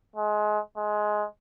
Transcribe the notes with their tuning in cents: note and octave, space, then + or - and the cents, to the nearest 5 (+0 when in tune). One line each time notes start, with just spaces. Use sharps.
G#3 +25
G#3 +15